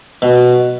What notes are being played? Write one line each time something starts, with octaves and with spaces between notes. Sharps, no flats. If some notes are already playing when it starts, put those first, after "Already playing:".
B2